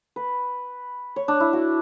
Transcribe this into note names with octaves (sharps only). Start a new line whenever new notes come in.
B4
C#5
D4
E4
F#4